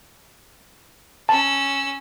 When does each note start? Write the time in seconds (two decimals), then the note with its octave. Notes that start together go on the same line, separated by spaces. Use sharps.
1.29 C#4 A5 E6